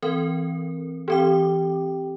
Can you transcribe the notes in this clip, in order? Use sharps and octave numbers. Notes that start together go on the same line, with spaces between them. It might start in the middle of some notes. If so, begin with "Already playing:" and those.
E3 C4 A#4
E3 C4 G4 G5 D6